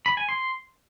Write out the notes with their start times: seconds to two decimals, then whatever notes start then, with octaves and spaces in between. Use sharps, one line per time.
0.06 B5
0.17 G#5
0.29 C6